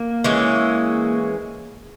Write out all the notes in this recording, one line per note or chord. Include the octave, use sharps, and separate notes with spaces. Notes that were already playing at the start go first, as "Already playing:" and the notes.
Already playing: A#3
E3 G#3 C#4